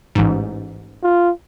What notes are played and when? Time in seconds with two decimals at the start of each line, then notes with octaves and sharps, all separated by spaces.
0.15 A1 G#2
1.03 F4